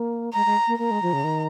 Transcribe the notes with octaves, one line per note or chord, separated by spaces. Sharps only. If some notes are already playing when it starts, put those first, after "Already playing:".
Already playing: A#3
G#3 A#5
G#3
A#3
A#3 A#5
G#3
F3
C#3
D#3